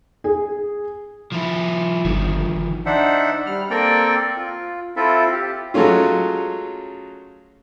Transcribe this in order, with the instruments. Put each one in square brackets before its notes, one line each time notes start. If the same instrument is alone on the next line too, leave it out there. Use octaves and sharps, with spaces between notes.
[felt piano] G#4
[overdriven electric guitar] F3 E4
[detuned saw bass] G1 [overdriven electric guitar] D#3 F3
[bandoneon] D4 D#4 C5 E5 F#5
G3 F6
A#3 C4 A4 A#4 D5 G5
F4
C4 E4 F4 A4 E5
G4
[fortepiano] F#3 G#3 A3 C#4 F4